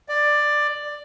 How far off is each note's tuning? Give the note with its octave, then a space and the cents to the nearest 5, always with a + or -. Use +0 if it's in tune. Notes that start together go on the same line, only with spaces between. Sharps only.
D5 +10